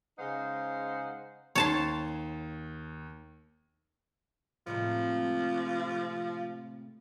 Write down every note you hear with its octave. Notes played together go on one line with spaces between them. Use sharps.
C#3 G#3 D#4 C5 F5 F#5
D#2 C#5 A5 C6
A2 C3 F3 G#3